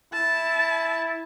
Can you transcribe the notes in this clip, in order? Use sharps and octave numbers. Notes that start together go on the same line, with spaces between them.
E4 A5